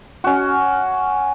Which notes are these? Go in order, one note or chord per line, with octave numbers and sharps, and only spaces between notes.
C#4 F#4